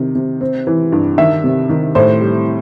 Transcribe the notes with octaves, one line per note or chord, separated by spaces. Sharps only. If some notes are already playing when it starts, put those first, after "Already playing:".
Already playing: C3 D#3
C3
C4
E3
G2
D#3 E5
C3
D#3
A2 C5
G3